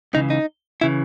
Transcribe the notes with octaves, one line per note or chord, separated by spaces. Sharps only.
C#2 C#3 E3 D#4
D#4
C#3 E3 E4